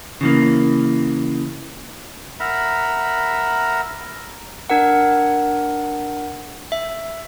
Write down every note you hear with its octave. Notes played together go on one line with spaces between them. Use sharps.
C#3 E3 A#3
A#4 E5 F#5 A#5 B5
D4 A#4 F#5
E5